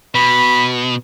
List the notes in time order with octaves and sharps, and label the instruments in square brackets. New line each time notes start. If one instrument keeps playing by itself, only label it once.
[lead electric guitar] B2 [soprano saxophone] B5